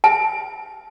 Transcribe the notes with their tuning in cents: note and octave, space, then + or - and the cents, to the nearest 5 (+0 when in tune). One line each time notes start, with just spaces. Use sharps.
A5 -35